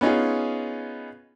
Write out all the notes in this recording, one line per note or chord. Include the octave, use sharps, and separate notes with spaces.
B3 C#4 D#4 F4 G#4